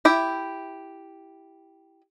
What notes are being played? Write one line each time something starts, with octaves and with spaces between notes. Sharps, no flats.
E4 G4 E5